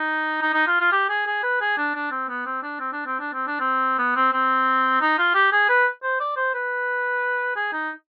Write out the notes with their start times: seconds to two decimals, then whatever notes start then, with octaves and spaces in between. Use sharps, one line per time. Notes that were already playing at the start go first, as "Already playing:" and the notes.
Already playing: D#4
0.42 D#4
0.54 D#4
0.67 F4
0.80 F4
0.92 G4
1.10 G#4
1.27 G#4
1.43 B4
1.61 G#4
1.78 D4
1.95 D4
2.11 C4
2.29 B3
2.46 C4
2.63 D4
2.80 C4
2.93 D4
3.06 C4
3.20 D4
3.34 C4
3.47 D4
3.60 C4
3.99 B3
4.16 C4
4.33 C4
5.02 D#4
5.18 F4
5.35 G4
5.52 G#4
5.69 B4
6.03 C5
6.20 D5
6.36 C5
6.55 B4
7.56 G#4
7.73 D#4